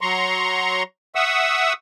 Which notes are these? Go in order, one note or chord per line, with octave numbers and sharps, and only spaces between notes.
F#3 A#5 C6 C#6
E5 F#5 C#6 D#6 E6